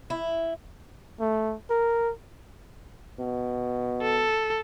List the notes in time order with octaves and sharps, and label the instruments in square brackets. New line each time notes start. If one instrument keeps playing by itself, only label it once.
[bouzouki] E4
[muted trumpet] A3
A#4
[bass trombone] B2
[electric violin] A4